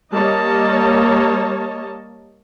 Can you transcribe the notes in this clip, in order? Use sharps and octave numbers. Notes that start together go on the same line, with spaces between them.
G3 A#3 C#5 D#5 A5